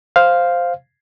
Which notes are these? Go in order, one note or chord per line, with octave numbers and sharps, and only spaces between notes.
C5 F5